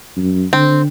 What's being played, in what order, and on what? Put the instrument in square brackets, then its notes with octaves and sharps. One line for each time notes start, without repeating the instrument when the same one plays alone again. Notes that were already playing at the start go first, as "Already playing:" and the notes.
[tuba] F#2
[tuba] D3 [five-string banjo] C4